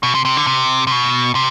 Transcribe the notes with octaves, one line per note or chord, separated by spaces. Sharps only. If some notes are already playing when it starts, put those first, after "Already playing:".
B2
C3
C3
D3
C3
C3
B2
C3